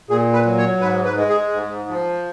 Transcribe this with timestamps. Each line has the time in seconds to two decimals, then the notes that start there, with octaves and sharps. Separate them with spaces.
0.09 A#2 G#4
0.33 B4
0.45 F#3
0.58 C#5
0.81 G#2 B4
1.05 B4
1.17 G#3
1.29 G#4
1.53 G#2
1.89 F3